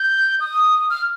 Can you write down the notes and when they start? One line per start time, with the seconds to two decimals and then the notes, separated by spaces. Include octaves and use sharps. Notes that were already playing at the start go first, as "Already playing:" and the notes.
Already playing: G6
0.40 D#6
0.90 F6